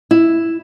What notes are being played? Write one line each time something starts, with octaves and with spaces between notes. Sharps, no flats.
E4